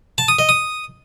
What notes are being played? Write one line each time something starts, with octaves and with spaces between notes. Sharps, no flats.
A5
D#6
D#5
D#6